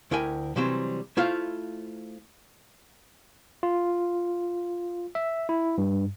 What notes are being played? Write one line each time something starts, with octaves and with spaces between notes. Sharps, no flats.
D2 E4 A#4 G5 G#5
C3 E3 F#3 G3 C4
A3 E4 F4 C5 F5
F4
E5
E4
G2